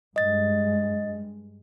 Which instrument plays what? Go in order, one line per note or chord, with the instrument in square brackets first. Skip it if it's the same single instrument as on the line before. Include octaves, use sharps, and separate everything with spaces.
[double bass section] G2 G#3 [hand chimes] D#5 A6